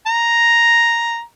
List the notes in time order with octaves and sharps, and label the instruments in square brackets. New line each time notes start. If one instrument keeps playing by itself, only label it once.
[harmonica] A#5